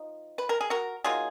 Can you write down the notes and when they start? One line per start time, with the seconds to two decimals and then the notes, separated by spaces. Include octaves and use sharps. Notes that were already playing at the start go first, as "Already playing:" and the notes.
Already playing: F3 D#4
0.38 B4
0.49 A#4
0.60 G#4
0.70 F#4 A#4
1.04 F#3 A#3 D#4 F4 G#4